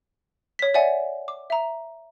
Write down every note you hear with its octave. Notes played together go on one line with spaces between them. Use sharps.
C#5 B6
C#5 D5 E5 F#5 G#5
D6
E5 A#5